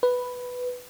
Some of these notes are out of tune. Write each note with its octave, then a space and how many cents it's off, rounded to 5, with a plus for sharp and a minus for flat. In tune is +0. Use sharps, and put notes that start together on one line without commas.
B4 +5